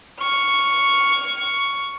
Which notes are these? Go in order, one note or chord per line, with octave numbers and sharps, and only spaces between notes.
C#6 F6